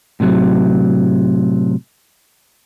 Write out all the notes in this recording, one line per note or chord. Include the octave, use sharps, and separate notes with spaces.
A2 C3 E3 F#3